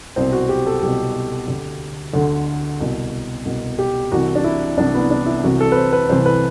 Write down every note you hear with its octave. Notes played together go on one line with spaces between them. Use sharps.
C2 B2 C4
F#4
G4
A4
C2 B2 G4
D2 D3
D2 D3
C2 B2
C2 B2
G4
C2 C3 E3 F#4
D4
E4
C2 C3 E3 D4
B3
D4
E4
C2 C3 E3 F#4
A4
B4
C5
B4
C2 C3 E3 C5
B4